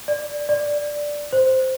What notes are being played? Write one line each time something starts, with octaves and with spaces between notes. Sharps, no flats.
D5
D5
C5